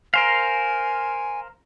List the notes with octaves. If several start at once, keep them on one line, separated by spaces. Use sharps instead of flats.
A#4 C5 F5 G#5